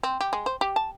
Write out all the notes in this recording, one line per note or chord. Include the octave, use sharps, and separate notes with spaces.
C4
G4
G#3
C5
G4
A5